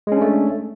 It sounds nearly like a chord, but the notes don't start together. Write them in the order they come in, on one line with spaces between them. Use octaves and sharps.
G#3 C#4 D4 A3